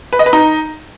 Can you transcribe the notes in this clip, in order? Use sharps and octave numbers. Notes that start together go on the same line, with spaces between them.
B4
D#5
B4
D#4